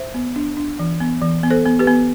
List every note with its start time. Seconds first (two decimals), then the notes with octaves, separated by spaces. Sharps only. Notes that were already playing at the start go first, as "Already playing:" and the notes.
Already playing: C5 E5
0.14 B3
0.36 D4
0.57 D4
0.79 E3
1.00 B3
1.22 E3
1.43 B3
1.50 A4 C5
1.66 B3
1.79 G4 B4
1.87 B3